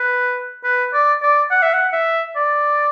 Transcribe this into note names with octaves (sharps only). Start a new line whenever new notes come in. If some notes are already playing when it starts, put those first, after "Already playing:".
Already playing: B4
B4
D5
D5
F#5
E5
F#5
E5
D5